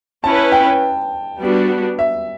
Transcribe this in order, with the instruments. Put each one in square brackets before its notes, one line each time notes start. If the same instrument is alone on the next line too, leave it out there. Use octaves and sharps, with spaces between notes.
[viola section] C#4 E4 B4 [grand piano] A5
[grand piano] G5
[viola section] G3 B3 D4 F#4
[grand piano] E5